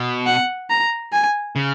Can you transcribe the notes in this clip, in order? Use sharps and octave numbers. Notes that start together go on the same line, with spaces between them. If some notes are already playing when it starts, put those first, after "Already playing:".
Already playing: B2
F#5
A#5
G#5
C#3